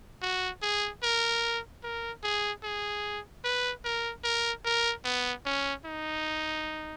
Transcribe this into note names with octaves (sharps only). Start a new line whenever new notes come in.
F#4
G#4
A#4
A#4
G#4
G#4
B4
A#4
A#4
A#4
B3
C#4
D#4